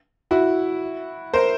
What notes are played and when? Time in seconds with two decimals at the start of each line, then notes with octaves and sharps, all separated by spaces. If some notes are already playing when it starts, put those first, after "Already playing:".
0.31 E4 F#4
1.34 A#4 C5